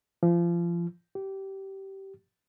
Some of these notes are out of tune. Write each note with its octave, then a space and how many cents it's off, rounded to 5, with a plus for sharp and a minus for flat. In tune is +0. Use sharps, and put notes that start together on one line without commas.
F3 -30
G4 -20